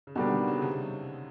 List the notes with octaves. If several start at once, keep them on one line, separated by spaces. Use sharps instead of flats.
C#3
B2 D3 G3 A#3 D4
D#3
D3
C#3
C3